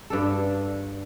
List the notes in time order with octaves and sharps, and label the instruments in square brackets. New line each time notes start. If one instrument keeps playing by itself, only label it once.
[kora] G2 D4 A4